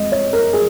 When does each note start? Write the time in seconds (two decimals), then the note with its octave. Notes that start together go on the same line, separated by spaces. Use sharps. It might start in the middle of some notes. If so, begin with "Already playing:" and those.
Already playing: F2 G#3 D#5
0.12 C#5
0.33 A#4
0.53 G#4